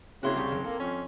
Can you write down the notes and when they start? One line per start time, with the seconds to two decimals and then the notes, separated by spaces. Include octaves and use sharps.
0.23 C#3 A#3 C4 E4 F#4 C6 G#6
0.36 C2 G4 C#6
0.52 F#1
0.64 A#3 A4
0.79 F2 C#4